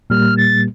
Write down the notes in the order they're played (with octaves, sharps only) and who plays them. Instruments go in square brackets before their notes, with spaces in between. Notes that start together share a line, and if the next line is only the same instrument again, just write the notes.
[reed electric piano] A#2 G3 A#3 [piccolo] F6
[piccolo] A6